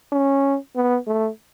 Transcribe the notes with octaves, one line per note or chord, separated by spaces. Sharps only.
C#4
B3
A3